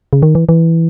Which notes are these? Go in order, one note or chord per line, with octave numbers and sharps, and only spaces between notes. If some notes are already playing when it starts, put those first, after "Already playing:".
C#3
D#3
E3
E3